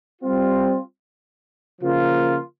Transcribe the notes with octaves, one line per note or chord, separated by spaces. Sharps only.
G3 C4 F4
C#3 F3 A#3 F4